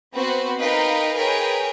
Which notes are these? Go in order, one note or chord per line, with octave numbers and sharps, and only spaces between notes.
B3 C4 F#4 B4 C5
D#4 A#4 B4 D#5 F5 G5
G#4 A#4 B4 C#5 G5